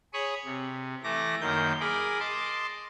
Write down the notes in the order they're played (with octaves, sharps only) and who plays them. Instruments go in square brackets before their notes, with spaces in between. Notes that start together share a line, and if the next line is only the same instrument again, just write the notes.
[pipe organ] G#4 C#5 B5 C#6 D#6
C3
E3 A3 D6 A#6
F#2 D#3 A#3 G6
G#4 A#4 B5 D6
D#5 A5 C6 D6